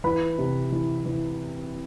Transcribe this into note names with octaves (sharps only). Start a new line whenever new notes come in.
E3 B4 B5
C3
E3
E3